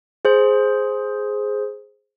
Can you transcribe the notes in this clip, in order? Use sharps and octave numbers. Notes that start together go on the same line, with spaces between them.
G#4 C5